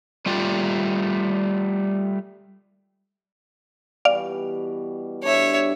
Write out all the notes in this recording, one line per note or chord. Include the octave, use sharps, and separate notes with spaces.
G3 A3 F4 G4
B2 E3 G3 D5 F5
G2 D3 D4 C#5 E5